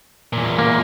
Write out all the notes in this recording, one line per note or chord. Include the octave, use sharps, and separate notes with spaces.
E2 A#2
A#3